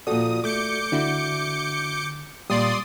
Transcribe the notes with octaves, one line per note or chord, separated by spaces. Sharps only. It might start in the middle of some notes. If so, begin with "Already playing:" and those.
A#2 F3 F#4 A4 D5 D#6
A3 D6 G6 C#7
D3 D4 E4 F#4
A#2 G3 D5 C6 D#6